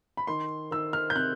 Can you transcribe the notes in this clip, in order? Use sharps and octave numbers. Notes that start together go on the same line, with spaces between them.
B5
D#3 C6
D#3 E6
F6
G6
C3 F#6